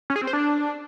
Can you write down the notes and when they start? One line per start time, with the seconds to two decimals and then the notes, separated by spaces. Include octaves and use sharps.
0.10 C#4
0.16 G#4
0.22 C4
0.27 C5
0.33 D4